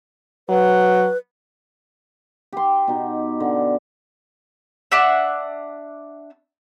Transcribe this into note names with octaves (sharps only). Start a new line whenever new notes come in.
F#3 B4
G4 C6
B2 D#4
D3
D4 E5 F#5 E6